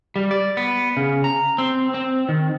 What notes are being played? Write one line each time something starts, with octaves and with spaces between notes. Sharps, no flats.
G3
D5
B3
C#3
A#5
C4
C4
D#3